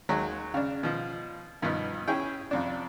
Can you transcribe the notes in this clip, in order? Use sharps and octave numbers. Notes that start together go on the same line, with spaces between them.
D#2 F#3 G#3
C#3 D4
B2 F3
G2 B2 F3 B3 D#4
C#4 E4 G#4 G5
F2 C3 D4